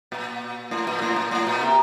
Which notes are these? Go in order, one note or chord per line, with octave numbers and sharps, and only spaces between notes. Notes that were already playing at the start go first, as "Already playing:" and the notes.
A#2
A2
A#2
A2
A#2
A2
A#2
C3